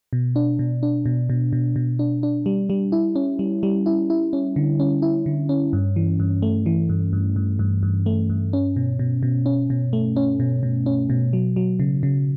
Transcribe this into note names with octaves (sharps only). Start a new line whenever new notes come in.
B2
D4
B2
D4
B2
B2
B2
B2
D4
D4
G3
G3
E4
C#4
G3
G3
E4
E4
C#4
D3
C#4
E4
D3
C#4
G2
E3
G2
A3
E3
G2
G2
G2
G2
G2
A3
G2
C#4
B2
B2
B2
C#4
B2
A3
C#4
B2
B2
C#4
B2
F#3
F#3
C#3
C#3